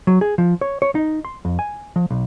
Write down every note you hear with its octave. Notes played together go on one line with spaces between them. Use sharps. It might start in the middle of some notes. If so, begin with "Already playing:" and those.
F#3
G#4
F3
C#5
C#5
D#4
C6
F2
G#5
F3
B1